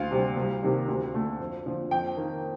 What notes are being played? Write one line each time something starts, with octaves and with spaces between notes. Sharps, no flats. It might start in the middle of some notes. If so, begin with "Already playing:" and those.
Already playing: D2 F5
C3 G3 C4
C2
C3 D#3 G3
D2
D3 A3
F2
D3 F3
F2 G5
D#3 A#3